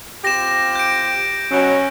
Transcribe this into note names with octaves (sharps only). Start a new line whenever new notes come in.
C4 F4 G4 A#6 E7
G6 D7
B2 F#3 C#4